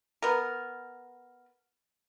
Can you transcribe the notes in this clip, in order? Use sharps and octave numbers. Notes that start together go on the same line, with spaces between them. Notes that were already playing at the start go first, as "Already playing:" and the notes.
B3 A#4